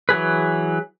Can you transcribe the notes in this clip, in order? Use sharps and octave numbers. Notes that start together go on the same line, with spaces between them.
E3 F#3 G#4 B4